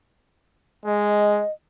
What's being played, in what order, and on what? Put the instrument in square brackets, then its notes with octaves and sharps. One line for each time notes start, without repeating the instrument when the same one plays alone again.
[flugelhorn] G#3 [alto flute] D#5